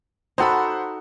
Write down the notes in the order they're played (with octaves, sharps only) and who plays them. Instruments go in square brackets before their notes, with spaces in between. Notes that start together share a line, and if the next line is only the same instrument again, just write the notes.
[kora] D#4 F#4 A4 [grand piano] C5 F#5 B5